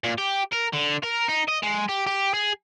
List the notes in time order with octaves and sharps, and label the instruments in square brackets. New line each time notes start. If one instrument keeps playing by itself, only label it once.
[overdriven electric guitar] A#2
G4
A#4
D3
A#4
D#4
D#5
G#3
G4
G4
G#4